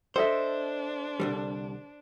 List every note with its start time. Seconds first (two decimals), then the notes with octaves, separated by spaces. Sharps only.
0.16 D4 A4 C5 D#5 E5
1.20 C2 D3 G3